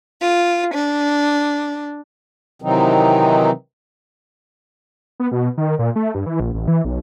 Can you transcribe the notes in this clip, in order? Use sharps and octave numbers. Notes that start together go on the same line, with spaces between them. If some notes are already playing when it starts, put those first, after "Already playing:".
F4
D4
C3 D#3 E3 F#3 C4 D#4
B3
B2
D#3
A#2
A3
G2
E3
A#1
A1
E3
B1